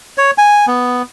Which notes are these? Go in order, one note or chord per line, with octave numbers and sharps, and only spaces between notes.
C#5
G#5
B3